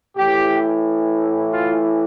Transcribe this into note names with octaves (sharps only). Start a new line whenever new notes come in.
A2 E3 G4
F4